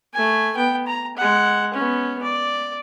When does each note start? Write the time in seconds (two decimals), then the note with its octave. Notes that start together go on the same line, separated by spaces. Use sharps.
0.13 A3 G#5
0.57 B3 G5
0.87 A#5
1.17 G#3 F#5
1.74 B3 C#4
2.23 D5